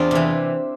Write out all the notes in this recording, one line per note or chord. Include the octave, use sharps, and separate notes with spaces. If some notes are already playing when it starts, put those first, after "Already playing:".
Already playing: E2 C4 D4 F4
C3 E3